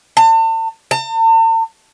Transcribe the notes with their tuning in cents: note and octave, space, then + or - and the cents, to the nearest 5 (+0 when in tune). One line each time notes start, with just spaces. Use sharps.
A5 +40
A5 +45